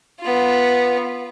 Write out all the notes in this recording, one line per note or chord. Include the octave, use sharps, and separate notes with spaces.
B3 F4